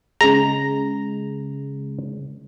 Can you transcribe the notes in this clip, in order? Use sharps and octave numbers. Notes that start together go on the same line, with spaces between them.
C#3 G#3 A#5